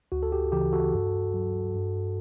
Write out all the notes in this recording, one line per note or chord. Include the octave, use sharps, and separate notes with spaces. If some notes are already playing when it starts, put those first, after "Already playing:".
D2 F#4
A4
G4
C#3 E3 G4
F#4 A4
G2
F#3
G2